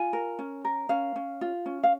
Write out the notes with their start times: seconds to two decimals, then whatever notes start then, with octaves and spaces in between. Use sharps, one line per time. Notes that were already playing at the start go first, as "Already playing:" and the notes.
Already playing: F4 G#5
0.13 A#4
0.39 C#4
0.65 A#4
0.89 C#4 F5
1.16 C#4
1.41 F4
1.66 C#4
1.83 F5